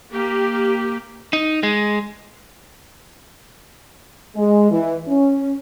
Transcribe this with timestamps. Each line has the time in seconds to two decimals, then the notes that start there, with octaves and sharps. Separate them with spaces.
0.12 A#3 G4
1.33 D#4
1.63 G#3
4.36 G#3
4.71 E3
5.08 C#4